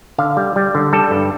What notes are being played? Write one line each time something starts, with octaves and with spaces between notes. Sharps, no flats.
D3 F5
G3
G3
D3
G3 A4
G2